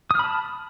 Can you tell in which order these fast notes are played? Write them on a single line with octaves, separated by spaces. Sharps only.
D#6 F6 B5 A5